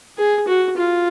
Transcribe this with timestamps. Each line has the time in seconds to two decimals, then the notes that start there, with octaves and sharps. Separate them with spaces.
0.18 G#4
0.48 F#4
0.76 F4